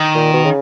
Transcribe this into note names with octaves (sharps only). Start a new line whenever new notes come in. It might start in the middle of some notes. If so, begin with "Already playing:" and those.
Already playing: D#3
A#2
B2
C#3